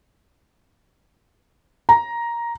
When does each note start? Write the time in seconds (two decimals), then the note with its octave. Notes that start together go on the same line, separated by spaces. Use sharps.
1.89 A#5